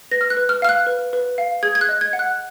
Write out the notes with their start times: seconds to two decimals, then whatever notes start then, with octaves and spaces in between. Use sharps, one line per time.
0.11 B4 A#6
0.21 F6
0.30 F#6
0.37 B4
0.49 F6
0.62 F5 F6
0.69 F#6
0.87 B4
1.13 B4
1.38 F5
1.63 G#4 G#6
1.75 G#6
1.81 F#6
1.89 D#5
2.01 G#6
2.13 F#5
2.19 F#6